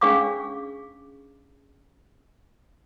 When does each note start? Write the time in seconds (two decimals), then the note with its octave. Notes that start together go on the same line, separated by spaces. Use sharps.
0.01 C#4 D4 G#4 F5 C#6 D6